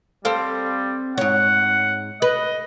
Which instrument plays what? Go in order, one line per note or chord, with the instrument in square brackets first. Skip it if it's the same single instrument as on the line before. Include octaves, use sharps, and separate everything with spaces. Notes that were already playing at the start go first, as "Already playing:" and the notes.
[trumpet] G3 [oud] C4 A4 F5
[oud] G#2 C#5 [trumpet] F#5
[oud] B4 [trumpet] D#5